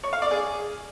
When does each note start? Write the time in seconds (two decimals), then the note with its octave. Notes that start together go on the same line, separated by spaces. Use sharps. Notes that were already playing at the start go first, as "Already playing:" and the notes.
0.04 C#5
0.13 F5
0.22 D5
0.31 G#4